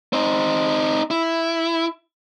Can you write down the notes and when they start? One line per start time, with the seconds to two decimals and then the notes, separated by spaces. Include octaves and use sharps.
0.13 C4 D#4
1.11 E4